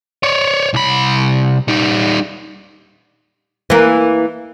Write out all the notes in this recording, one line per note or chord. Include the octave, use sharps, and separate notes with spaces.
C#5 D5
C2 B5
G3 D#4
E3 A#3